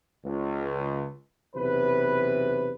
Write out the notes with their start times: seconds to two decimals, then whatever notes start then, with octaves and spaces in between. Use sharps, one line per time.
0.25 C#2
1.55 B1 E2 C3 B4